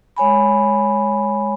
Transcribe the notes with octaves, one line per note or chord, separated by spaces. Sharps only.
G#3 C#5 G#5 B5